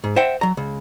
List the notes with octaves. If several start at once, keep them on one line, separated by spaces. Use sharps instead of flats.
G#2
C5 E5 F#5 G5
F#3 A#5
C#2